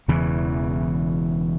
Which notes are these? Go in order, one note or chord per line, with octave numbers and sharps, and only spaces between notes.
E1 E2 C#3 E3